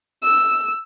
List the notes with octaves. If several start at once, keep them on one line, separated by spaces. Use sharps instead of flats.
E6